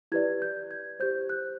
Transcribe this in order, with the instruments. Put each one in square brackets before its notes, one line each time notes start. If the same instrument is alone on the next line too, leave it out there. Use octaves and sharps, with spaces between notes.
[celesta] E4 G4 B4 D5 G#6
G6
G#6
G4 C5 G6
F#6